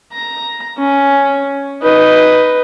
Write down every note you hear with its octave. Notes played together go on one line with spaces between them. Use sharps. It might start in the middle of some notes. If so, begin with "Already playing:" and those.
A#5
C#4
D#4 B4